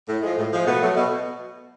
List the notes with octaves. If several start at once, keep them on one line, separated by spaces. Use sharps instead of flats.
A2
F3 G#3
A2
F3 G#3
B2 A3 B3
F#3 A3
B2